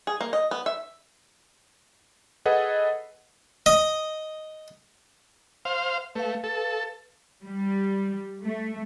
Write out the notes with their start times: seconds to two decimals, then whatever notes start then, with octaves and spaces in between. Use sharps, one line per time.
0.07 G#4
0.21 A#3
0.33 D#5
0.51 B3
0.66 E5
2.46 G#4 A4 B4 D#5 F#5
3.66 D#5
5.65 C5 F5
6.15 A3 B4 F5
6.44 A4
7.45 G3
8.42 A3